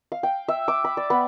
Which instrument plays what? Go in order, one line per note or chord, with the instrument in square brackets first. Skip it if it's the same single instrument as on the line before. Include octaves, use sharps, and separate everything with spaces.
[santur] F5
G5
E5
D6
B5
D5
B3